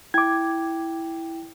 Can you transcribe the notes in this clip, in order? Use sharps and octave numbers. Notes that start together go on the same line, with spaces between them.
E4 G5 D6 G#6